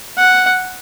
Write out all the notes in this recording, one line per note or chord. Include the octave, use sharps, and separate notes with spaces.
F#5